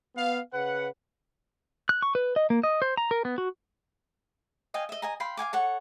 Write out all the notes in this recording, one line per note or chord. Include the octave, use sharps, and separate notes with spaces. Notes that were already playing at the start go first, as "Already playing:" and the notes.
B3 F5
C#3 B4 F#5
F#6
C#6
B4
D#5
A#3
D#5
C5
A#5
A#4
B3
F#4
D#5 F5 G5 G#5
D#5 E5
D#5 G#5 A#5
F5 G5 B5 C6
F5 F#5 G#5 D6
A4 C#5 F#5